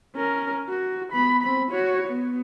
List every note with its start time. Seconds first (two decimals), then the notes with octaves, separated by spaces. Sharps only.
0.15 C#4 A#4
0.69 F#4
1.12 B3 B5
1.43 C4 B5
1.71 F#4 C#5
2.08 B3